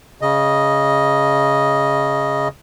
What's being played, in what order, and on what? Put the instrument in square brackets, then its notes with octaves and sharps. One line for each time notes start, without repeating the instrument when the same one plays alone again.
[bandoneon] C#3 D#5